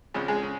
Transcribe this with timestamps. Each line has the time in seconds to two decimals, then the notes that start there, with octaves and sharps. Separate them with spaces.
0.14 C#2 C#3 F3 G#3
0.28 G#3 G#4
0.43 C#3